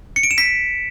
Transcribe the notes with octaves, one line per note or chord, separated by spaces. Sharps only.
C#7
D7
E7
B6